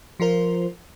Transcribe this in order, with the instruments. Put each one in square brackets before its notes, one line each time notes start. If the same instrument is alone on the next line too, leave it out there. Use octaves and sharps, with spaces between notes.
[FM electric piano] F3 F4 A#4 C5